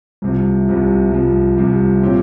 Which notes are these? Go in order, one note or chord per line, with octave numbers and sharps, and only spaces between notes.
C2 C3 F3
C2 C3 F3
C2 C3 F3
C2 C3 F3
A#2 F3 C4 G4 C#5